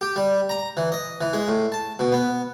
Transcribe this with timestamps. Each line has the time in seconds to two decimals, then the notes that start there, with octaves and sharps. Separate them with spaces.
0.01 G4
0.16 G3
0.49 A#5
0.77 E3
0.92 D#5
1.21 E3
1.33 G#3
1.48 A2
1.72 A5
1.99 B2
2.12 B3